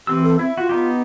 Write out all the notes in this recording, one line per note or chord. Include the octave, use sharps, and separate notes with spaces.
E3 C4 G4 E6
A4
C4 E4
F4 F#4
B3 D#4 G4